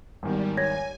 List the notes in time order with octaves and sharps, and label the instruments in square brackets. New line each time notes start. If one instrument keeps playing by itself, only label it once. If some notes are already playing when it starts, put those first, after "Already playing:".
[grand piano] G#1 E2 D#3 [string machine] G3
[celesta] C#5 G#6 A#6 [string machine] G#5